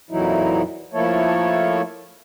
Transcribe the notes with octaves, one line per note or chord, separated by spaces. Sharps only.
F2 A#2 E3 F#3 D#4 E4
F3 A3 A#3 E4 A4 C#5